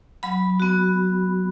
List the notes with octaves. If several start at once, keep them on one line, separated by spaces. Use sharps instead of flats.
F#3 B5
B3 F#4